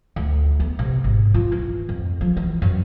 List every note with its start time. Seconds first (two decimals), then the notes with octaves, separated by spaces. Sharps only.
0.16 D2
0.60 B3
0.79 C3
1.04 G#1
1.34 F4
1.52 E3
1.89 F2
2.21 F3
2.37 E3
2.62 F#2